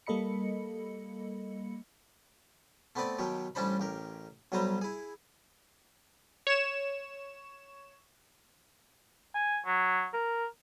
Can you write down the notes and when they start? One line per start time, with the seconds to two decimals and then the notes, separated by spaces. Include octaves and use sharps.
0.07 G3 A#3 A4 D#5 B5 C#7
2.95 A3 B3 C4 B4 D5
3.19 B2 D#3 F#3 G4
3.55 A1 G3 C#4 D4 C5 B5
3.80 A1 G4 A#4
4.52 B1 F#3 G3 B4 C5 A#5
4.81 E4 G#4
6.47 C#5 E7
9.35 G#5
9.66 F#3
10.14 A#4